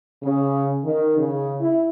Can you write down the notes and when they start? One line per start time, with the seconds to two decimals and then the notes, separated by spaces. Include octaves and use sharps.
0.23 C#3
0.85 D#3
1.18 C#3
1.61 E4